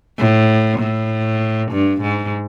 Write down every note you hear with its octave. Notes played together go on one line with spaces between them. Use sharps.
A2
A2
G2
G#2